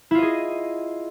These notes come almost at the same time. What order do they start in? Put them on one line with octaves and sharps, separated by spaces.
E4 F4 D#5 G#4